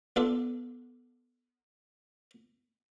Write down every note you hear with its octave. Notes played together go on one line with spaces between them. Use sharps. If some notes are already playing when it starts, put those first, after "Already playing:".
B3 D4 F4 A4